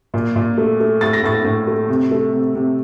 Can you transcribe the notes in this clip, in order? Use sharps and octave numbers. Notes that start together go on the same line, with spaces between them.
A#2
A#2
A3
A3
A2 A6
A#6
A2 A6
A2
A3
C3
A3
C3
C3